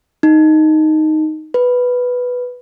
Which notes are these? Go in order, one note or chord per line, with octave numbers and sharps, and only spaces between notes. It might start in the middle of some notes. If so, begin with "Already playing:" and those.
D#4
B4